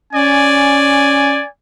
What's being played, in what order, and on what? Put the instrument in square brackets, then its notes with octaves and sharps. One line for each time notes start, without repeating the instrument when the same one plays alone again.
[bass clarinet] C#4 [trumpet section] D5 G#5